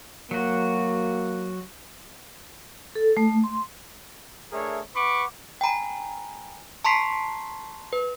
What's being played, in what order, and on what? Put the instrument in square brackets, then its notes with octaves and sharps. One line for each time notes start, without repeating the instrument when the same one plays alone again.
[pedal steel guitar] F#3 F#4 [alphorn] A#3
[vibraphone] A4
A3
C6
[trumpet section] A3 D4 G#4 A#4 C#5 E5
B4 F#5 B5 C#6 D6
[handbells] G5 G#5 A#5 B5
A5 A#5 C6 C#6 B6 C7
B4